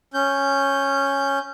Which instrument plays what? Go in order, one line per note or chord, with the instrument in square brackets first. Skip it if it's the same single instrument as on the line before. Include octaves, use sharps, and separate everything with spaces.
[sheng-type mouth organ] C#4 G6